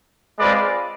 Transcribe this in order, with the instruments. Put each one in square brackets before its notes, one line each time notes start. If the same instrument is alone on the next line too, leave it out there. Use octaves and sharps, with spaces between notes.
[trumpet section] G#3 C4 F4 B4 D5